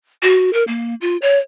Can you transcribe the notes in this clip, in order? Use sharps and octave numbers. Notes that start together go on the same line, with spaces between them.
F#4
A#4
A#3
F4
C#5